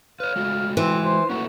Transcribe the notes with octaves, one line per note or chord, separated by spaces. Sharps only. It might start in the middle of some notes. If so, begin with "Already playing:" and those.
B4 C#5 F5
G#3 A3 F#4
E3 C4
C5
A3 A#3 C#4 F#4